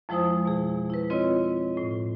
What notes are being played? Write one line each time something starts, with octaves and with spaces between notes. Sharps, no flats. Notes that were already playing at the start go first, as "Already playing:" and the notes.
F2 F3 G#3 E4 C5 D#6
B2 G#4
E4 B4
C4 E4 F4 C#5 D#5
A2